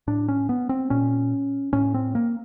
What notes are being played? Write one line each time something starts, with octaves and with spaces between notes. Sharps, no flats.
A2 D4
C#4
B3
C4
A#2 C#4
A2 C#4
C4
A#3